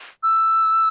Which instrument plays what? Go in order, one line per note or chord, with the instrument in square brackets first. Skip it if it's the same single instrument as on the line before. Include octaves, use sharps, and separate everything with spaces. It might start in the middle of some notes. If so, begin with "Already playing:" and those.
[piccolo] E6